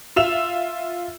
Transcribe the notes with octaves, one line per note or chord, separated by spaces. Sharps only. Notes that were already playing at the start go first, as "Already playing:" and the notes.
F4 E5 E6 E7 F7